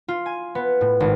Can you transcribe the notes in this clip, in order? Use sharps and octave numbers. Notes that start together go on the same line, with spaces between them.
F4
G#5
B3
A2
G#1